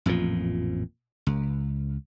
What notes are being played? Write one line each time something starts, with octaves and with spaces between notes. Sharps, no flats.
A1 F2 A#2 F3
C#2